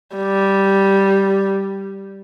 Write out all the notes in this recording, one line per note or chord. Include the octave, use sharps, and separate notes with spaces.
G3